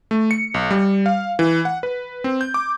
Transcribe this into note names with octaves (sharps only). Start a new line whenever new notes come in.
A3
C#7
B1
G3
F5
E3
F#5
B4
C4
G6
D6